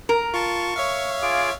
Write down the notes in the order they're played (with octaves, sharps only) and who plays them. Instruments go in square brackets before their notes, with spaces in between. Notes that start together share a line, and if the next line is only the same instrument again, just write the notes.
[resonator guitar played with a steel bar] A#4
[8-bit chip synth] F4 A5 [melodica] C#6
[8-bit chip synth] C#5 E5 F5
[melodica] F4 G#4 D6